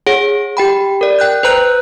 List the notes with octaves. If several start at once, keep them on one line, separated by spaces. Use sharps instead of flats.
G#4 C#5 F#5
G4 G5 B5
A#4 D5
G5 F#6 G6
B4 C5 A#5 F#6 G6